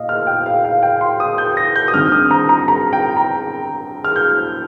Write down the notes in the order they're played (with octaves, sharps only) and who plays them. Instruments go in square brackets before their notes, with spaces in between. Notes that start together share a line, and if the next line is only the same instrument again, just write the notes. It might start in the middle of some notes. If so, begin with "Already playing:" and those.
Already playing: [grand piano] A#2 D#5 F5
F6
G5
F5
F5
G5
C6
D#6
G6
A#6
G6
D#6
G2 D#3 C4 F6
D#6
A#5
A#5
A#5
G5
A#5
F6
G6